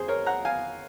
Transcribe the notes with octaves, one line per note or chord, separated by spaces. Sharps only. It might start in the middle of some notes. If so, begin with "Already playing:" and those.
Already playing: F2 G#4 C5
A#4 C#5
F#5 A#5
F5 G#5